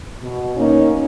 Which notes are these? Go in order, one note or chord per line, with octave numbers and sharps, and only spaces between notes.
B2
A#3 C#4 D#4